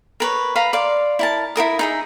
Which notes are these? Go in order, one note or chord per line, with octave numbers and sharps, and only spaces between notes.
A#4 B4 C#5
B4 F5 A#5 B5
D5 F5 C6
E4 A#4 A5
E4 F#4 A#4 D#6
D#4 G#4 E5